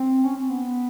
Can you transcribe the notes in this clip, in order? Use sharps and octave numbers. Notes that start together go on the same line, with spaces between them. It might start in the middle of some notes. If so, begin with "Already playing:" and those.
Already playing: C4
C#4
C4
B3